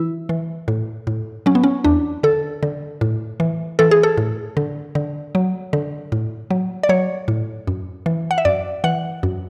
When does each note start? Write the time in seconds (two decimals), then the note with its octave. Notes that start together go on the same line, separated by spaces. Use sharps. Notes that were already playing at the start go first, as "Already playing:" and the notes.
Already playing: E3 E4
0.29 E3
0.68 A2
1.07 A2
1.46 F#3 C#4
1.55 B3
1.64 C#4
1.84 E2 D4
2.23 D3 A4
2.63 D3
3.01 A2
3.40 E3
3.79 E3 A4
3.91 G#4
4.03 A4
4.17 A2
4.57 D3
4.95 D3
5.35 F#3
5.73 D3
6.12 A2
6.51 F#3
6.83 D5
6.89 F#3 C#5
7.28 A2
7.67 F#2
8.06 E3
8.31 F#5
8.38 E5
8.45 F#2 D5
8.84 E3 F#5
9.23 F#2